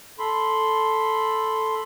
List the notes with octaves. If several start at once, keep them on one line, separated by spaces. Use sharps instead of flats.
A4 B5 C6